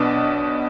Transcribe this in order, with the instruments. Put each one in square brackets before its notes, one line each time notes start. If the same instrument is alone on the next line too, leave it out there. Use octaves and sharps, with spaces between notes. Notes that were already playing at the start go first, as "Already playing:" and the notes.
Already playing: [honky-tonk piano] B1 B2 B3 [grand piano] D4